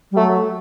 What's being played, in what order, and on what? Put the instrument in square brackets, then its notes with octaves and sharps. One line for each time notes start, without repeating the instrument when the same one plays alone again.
[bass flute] G3
[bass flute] F#3 [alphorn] A3